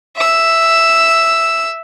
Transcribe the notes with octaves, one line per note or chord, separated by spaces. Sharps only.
E5 E6